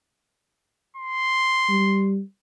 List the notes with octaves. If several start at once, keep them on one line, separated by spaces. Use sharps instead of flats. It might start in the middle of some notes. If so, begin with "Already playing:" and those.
C6
G3